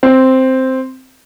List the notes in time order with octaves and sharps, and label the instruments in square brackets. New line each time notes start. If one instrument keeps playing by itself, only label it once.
[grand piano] C4